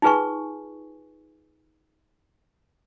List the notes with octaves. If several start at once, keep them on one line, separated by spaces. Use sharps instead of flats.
D#4 F4 G#4 B4 G#5 C#6